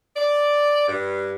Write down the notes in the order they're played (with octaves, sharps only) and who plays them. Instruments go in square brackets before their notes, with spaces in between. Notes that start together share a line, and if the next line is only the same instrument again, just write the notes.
[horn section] D5
G2